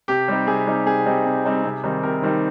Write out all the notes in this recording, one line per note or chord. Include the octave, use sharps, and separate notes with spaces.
C3 G4
G3 C4 D#4
C3 G#4
G3 C4 D#4
C3 G#4
G3 C4 D#4
C3
G3 C4 D#4
C3
D#3 G3 C4 D#4
C3 A#4
D#3 G3 C4 D#4